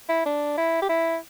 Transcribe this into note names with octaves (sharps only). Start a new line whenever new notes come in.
E4
D4
E4
G4
E4